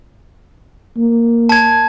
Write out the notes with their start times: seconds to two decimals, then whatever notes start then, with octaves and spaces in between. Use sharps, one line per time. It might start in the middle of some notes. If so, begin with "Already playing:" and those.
0.97 A#3
1.49 A5 G#6